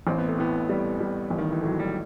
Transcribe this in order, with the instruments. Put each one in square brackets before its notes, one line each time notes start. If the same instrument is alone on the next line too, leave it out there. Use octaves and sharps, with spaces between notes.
[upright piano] A1 [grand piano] C4
[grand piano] B3
A3
[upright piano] A2 [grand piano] B3
[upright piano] G3
G3
A1
[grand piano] D#3
E3
[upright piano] A2 [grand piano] F#3
[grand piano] G3